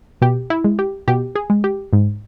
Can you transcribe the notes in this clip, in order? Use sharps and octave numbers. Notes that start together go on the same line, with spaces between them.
B2 G4
E4
G#3
G4
B2 G4
G#4
G#3
G4
G#2